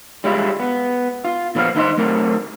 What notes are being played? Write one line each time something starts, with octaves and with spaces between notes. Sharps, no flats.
G3 G#3 E4 F4
B3
F4
A#2 F3 B3 G#4 F5
D#2 D#4 E4 C5 D#5 C6
F#3 A3 C4 A#4